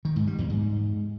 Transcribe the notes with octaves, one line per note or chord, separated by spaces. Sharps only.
D#3
G#2
G3
E2
G#2